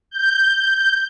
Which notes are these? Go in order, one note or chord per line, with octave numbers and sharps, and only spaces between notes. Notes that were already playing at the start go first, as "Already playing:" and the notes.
G6